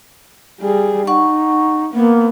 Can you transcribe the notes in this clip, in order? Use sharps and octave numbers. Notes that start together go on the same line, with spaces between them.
G3 G#4
D#4 F#5 C#6
A#3 B3